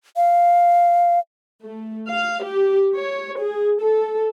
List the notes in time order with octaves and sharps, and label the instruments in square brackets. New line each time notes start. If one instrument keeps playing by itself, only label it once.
[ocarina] F5
[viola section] A3
F5
G4
C#5
G#4
A4